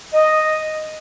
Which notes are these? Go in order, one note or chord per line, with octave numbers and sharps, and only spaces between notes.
D#5